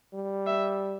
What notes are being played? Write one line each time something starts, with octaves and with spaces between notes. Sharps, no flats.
G3
E5